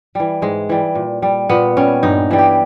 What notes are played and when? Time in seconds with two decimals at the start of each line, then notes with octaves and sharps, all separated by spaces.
0.15 E3 G3
0.42 G#2 G#3
0.69 E3 G3
0.95 A#2
1.22 G3
1.49 A#2 B3
1.77 G3 C#4
2.03 G2 D#4
2.31 E3 G3
2.38 G4